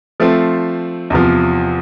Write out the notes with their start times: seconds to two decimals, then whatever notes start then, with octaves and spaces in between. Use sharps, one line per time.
0.20 F3 A3 C4
1.10 E2 C3 F3